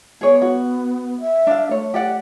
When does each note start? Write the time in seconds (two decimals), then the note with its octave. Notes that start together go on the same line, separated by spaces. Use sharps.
0.21 B3 G#4 C#5 D5
0.42 F#4
1.20 E5
1.47 D4 F5
1.71 A3 C#5
1.94 G4 D5 F#5